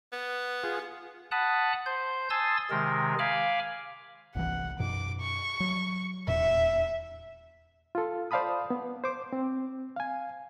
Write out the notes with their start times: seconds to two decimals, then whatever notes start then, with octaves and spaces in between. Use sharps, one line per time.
0.13 B3
0.64 F4 G#4
1.31 F#5 A5 B5 D#6 F#6
1.86 C5 G6
2.30 G#5 A5 C6 D#6 E6 A6
2.70 C3 D#3 G#3 A#4
3.19 F5 G#5 B5 D6 F6
4.35 G1 C2 E3 F#5
4.79 F#2 B2 D6
5.21 C#6
5.60 F#3
6.28 D#1 E2 A#2 E5
7.95 F4 A4
8.31 C5 D5 F5 A5 B5 D#6
8.70 B3
9.04 C5 D6
9.33 C4
9.96 F5 G#5